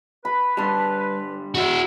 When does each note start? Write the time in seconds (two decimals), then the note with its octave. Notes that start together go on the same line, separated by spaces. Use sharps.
0.25 B4 B5
0.57 G2 D3 G3 A5 C6
1.55 E4 F#4